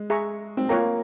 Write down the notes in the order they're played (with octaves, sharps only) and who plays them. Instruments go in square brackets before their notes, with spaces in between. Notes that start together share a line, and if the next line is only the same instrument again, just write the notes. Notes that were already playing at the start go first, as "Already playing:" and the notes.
Already playing: [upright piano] G#3
[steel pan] G#4 E5 A#5 C#6
[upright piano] C4
[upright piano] A#3 [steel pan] F4 A#4 C#5 G5 A#5